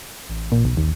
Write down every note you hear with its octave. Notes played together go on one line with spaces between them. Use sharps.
A1
A#2
B1
D#2